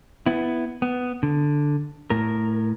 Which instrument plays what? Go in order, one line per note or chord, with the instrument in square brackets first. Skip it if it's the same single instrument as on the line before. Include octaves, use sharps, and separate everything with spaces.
[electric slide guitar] B3 E4
B3
D3
A2 A#4